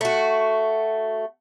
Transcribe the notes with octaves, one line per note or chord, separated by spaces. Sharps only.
A3 F#4